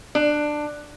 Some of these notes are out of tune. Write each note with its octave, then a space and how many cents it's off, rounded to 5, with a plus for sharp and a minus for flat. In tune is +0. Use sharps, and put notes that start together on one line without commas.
D4 +15